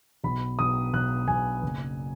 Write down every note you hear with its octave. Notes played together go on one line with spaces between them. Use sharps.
B1 B5
B1 D#6
B1 F#6
B1 G#5
F#1